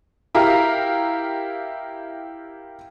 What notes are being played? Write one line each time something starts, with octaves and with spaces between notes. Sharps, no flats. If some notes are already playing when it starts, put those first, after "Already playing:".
E4 G4 A#4 F5 A#5